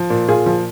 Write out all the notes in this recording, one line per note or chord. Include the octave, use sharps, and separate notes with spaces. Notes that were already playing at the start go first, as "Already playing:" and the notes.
Already playing: F3
A#2
A#2 F4 G#4
F3